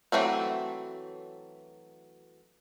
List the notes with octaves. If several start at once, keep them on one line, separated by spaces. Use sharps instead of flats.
E3 F#3 A3 C4